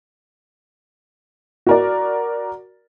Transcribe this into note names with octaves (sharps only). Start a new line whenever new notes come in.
F#4 A#4 D5